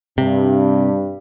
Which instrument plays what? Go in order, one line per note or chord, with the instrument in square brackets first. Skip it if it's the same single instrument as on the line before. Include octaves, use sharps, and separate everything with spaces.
[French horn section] G2 [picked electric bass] C3